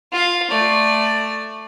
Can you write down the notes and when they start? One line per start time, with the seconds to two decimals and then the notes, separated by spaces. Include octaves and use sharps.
0.12 F4 F5
0.51 A3 D5